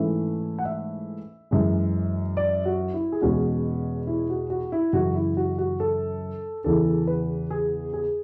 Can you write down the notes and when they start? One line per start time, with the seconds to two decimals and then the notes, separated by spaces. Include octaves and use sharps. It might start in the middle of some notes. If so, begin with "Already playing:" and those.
Already playing: G#2 E3 A3 C#4 E5
0.59 F#5
0.65 E5
1.51 F#2 E3 G#3
2.37 D5
2.65 F#4
2.94 E4
3.12 G#4
3.21 E2 B2 G#3 C#4 F#4
4.07 E4
4.30 F#4
4.50 F#4
4.72 E4
4.93 F#2 C#3 E3 F#4
5.15 E4
5.37 F#4
5.58 F#4
5.80 A4
6.64 E2 C#3 E3 A4
7.07 B4
7.51 G#4
7.93 G#4